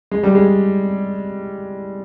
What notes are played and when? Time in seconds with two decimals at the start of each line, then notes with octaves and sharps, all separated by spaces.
0.11 G#3
0.23 G3
0.35 G#3